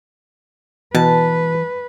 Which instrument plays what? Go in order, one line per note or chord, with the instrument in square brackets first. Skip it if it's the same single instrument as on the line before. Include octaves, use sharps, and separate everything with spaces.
[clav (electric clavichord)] B2 [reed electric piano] E3 [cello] B4 [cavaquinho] A5